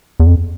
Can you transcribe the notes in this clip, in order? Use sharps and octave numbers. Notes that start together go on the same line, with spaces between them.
E2
F2